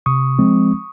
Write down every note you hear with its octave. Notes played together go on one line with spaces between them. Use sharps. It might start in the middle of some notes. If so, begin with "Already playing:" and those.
C3 C#6 D#6
F3 G#3 C4